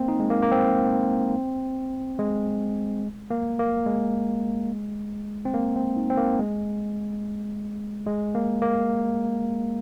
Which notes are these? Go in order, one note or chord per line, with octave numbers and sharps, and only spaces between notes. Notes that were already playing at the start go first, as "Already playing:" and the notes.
Already playing: A#3 C4
D#4
G#3
A#3
A#3
C4
G#3
A#3
A#3
G#3
C4
A#3
C4
D#4
C4
A#3
G#3
G#3
A#3
A#3